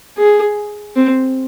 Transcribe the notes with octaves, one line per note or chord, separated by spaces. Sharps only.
G#4
C4